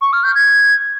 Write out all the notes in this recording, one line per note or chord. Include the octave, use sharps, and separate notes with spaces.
C#6
F6
G6
G#6